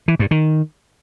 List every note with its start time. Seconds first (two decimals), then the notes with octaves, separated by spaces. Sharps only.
0.08 E3
0.19 G2
0.31 D#3